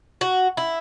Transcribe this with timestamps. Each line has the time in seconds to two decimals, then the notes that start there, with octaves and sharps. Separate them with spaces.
0.21 F#4
0.57 E4